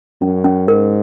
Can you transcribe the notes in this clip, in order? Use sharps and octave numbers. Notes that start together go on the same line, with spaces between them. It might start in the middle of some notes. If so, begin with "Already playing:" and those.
F#2 C#4
C#4
G#2 A#4